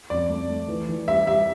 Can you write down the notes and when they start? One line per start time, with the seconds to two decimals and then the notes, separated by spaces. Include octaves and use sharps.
0.10 F2 D5
0.29 A3
0.49 A3
0.68 E3
0.89 E3
1.08 G3 E5
1.27 G3 E5